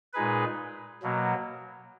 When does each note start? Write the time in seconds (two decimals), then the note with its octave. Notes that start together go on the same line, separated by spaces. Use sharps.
0.13 A#2 G#3 D#4 G#4 B4
1.03 B2 F#3 A#3